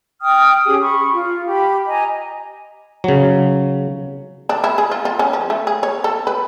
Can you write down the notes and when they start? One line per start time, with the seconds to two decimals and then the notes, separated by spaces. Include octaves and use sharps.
0.21 G5 D#6 F6
0.65 C#4 G4 G#4 D#6
0.81 B5 C#6
1.14 F4
1.46 G4 B5
1.87 D#5 G#5 A#5
3.04 C#3 F#3
4.49 D4
4.64 E4
4.78 G#4
4.91 F4
5.05 F4
5.19 C#4
5.33 F3
5.50 A3
5.67 G#4
5.83 C#5
6.04 A4
6.27 B4